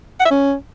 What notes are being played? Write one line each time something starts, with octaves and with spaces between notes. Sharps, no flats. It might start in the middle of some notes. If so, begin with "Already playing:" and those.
F#5
E5
C#4